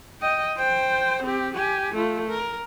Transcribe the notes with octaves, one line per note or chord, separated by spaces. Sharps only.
D#5 G5
C5 G5
C4 G4
G4 G#5
A3 F4
A#4